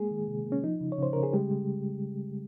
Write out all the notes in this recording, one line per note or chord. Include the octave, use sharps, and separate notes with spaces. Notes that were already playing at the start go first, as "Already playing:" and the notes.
Already playing: G#3 A#3 G#4
D#3
C3
A#3
C#4
F3 D#4
C#3
C#5
C#3 C5
C#3 A#4
G#4
G3 G#3 G4
G#3